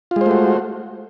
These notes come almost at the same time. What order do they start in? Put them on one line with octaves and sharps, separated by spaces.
F4 G#3 C5 A3 F#4